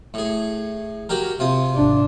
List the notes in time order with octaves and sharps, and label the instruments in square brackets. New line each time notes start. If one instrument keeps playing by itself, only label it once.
[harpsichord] A2 G#4
F#3 G4 A#4
C3 F4 D#6
[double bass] G#1 D4